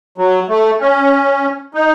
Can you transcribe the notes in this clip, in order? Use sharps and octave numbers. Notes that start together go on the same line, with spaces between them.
F#3
A3
C#4
D#4